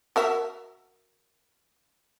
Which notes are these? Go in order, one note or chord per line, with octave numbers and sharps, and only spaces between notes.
F#4 A#4 E5